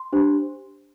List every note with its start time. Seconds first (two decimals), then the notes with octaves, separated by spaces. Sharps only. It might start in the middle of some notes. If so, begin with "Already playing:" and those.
Already playing: C6
0.13 D4 G4 C5